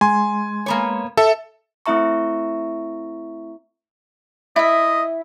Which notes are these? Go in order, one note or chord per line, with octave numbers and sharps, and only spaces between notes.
G#3 G#5 C6
A#3 B3 C#5
A4 E5
A3 C4 E4 E5 A#5 C#6
E4 D#5 E5